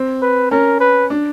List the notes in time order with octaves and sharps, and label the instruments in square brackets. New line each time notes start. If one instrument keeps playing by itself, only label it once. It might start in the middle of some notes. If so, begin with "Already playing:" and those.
Already playing: [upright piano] C4
[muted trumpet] B4
[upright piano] C#4 [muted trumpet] A#4
[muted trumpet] B4
[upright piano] D4